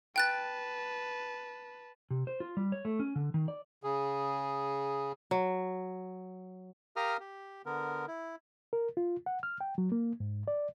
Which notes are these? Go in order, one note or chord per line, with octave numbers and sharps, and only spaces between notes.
B4 G5 A5 F#6 A6
C3
C5
F4
G3
C#5
A3
C#4
D3
D#3
D5
C#3 G#4
F#3
G4 A#4 F5 A#5 D#6 F6
G4
D3 B3 A#4
E4
A#4
F4
F#5
F6
G5
F#3
A#3
G#2
D5